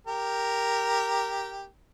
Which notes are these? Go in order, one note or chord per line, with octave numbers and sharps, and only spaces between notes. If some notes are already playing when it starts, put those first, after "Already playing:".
G4 A#4